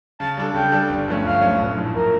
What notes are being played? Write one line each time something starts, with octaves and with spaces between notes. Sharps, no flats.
C#3 A5
G3 D4 A4
C#3 G5
G3 D4 A4
G1
G2 F3 A3 C#4
G1 F5
G2 F3 A3 C#4
A#1
A2 F3
A#1 A#4